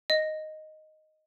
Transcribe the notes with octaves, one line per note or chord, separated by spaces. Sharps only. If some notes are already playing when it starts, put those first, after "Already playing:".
D#5